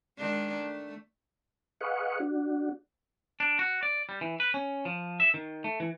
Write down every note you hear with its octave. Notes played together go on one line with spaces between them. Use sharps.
D#3 G#3 D4
A3
G#4 B4 D#5 F5 F#5 C#6
D4 F#4
D4
F#4
D5
G3
E3
B4
C#4
F3
E5
D#3
A3
E3